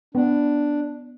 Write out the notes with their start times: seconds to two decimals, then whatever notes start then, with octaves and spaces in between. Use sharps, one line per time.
0.15 B3 D4